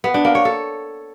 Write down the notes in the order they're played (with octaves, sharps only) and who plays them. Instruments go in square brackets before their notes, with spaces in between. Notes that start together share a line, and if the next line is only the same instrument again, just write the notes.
[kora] B3
D4
A#3
C#5
A4